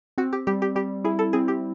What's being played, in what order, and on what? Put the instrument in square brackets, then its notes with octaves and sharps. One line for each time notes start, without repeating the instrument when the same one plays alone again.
[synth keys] C4 [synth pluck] F#4
[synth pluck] G4
[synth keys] G3 [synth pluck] G4
[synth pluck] G4
[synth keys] G3 [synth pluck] G4
[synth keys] E4 [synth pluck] G#4
[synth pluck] A4
[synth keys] C4 [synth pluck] G#4
[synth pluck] G4